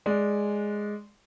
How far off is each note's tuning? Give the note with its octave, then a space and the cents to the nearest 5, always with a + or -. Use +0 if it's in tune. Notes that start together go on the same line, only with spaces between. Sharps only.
G#3 +0 D5 +0